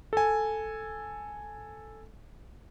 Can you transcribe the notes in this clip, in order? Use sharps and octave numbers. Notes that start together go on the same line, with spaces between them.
A4 G#5